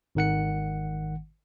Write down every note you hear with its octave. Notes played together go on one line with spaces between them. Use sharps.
G#1 D#3 F#5 C#7